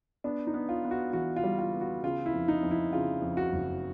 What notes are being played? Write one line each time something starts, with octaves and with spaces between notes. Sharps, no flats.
B3 D4
D#4
B3
F4
B3
F#4
E3 F#4
F4
G3
F4
B3
F#4
C#3 F4
E4
F2
D#4
F2
E4
C#3 F4
F2
F#4
F#1